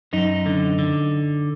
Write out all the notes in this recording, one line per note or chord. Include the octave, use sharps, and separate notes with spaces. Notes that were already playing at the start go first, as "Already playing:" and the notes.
F#2 D#4
D3
D3